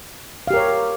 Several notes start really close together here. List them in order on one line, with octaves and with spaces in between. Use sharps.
F5 G4 A#4 C#5